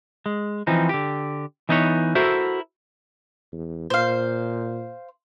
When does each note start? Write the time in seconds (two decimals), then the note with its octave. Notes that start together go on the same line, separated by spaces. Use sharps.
0.26 G#3
0.67 E3 F3 C4 D#4
0.89 D3 G4
1.69 E3 B3 D#4 E4 B4 C#5
2.15 E4 F#4 A4 A#4 C5 E5
3.52 E2
3.90 A#2 C5 F5